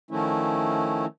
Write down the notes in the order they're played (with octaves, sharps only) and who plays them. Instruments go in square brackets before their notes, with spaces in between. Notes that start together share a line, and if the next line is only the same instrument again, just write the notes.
[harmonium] D#3 F3 A3 C#4 E4